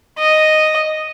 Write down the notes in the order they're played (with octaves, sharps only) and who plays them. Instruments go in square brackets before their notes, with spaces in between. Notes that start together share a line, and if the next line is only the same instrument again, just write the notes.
[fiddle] D#5